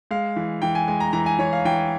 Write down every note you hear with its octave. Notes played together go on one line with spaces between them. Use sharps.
G#3 F5
E3
E3 G5
G#5
G#3 G#5
A#5
E3 A#5
G#5
E3 C#5
F5
E3 G5